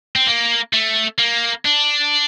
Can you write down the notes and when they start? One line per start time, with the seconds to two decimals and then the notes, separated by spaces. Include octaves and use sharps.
0.16 C4
0.27 A#3
0.73 A3
1.19 A#3
1.65 D4